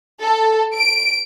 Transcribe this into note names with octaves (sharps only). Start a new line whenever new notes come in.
A4
D7